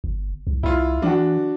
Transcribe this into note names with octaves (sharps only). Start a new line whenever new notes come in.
G1
C2
C2 E4 F4
E3 D4 F#4